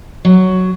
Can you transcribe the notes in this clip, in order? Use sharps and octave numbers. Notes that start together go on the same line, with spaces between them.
F#3